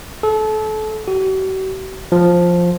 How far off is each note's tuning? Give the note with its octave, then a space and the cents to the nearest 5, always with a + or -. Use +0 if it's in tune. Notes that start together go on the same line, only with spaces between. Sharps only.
A4 -30
F#4 +45
F3 +5